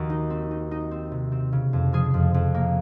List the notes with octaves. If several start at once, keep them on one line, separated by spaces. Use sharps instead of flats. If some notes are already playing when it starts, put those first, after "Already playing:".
Already playing: D#2 D#3 F#4
D#4
C4
D#4
D#4
C4
C3
C4
C#3
F2
F3 G#4
F2
F2
A#3